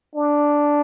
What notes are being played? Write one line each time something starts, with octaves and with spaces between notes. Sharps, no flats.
D4